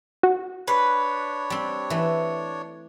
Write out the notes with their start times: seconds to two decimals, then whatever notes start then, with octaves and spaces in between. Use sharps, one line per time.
0.23 F#4
0.68 D4 B4 C#5
1.50 G3 C4
1.90 E3 A3